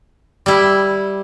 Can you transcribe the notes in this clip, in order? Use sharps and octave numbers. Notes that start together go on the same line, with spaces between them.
G3 E4